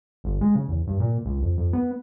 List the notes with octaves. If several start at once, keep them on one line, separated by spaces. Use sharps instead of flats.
G1
G#3
C#3
E2
G2
A#2
C#2
F2
F2
B3